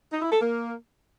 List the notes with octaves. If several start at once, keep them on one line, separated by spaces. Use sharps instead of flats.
D#4
E4
A4
A#3